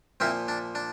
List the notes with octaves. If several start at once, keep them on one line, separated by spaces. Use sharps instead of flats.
A#2 F3 A#3 C4 E4
D4
D4